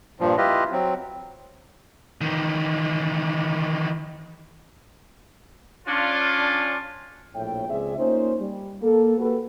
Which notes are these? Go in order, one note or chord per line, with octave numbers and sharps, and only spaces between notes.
G2 A#2 F3
E4 F4 G4 B4 D#5
F#3 C4
D#3 E3
C#4 D4 F4
A#1 A2 C#5 E5 G5
C#2 C4 G#4 D5 E5
A#3 C#4 D#4 F4 C5
G3
A#3 A4
A#3 F#4 G4 A4 B4